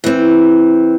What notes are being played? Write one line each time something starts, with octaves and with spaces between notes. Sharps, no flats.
E3 C4